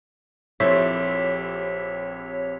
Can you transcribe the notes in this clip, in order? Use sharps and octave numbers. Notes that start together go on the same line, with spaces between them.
A#1 C4 E4 G4 A4 C5 C#5 B6